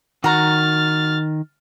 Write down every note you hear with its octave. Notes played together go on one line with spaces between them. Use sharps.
D#3 F#4 A#5 F6 A6